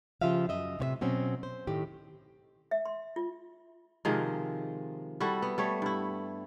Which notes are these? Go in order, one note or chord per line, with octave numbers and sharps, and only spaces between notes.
C#3 F3 F4 G4 E5 F5
F#2 D#5 E5
A2 C3 C#5 E5
B2 F#3 C4 C#4 F#4
C5
A2 D#3 G4
E5
C6
F4
C3 D#3 F3 G#3
G3 E4 F#4 A4
B3
G3 A3 C#5
G2 E4